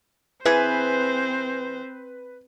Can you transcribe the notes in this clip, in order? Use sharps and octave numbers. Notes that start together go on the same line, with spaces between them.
E3 C4 G#4 B4 C5